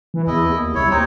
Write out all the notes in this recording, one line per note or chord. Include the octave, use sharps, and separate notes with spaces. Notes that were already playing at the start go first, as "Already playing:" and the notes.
E3
E2 E4 D#5
D#2
C2 E4 C#5
D#2 C4 D#4 C#5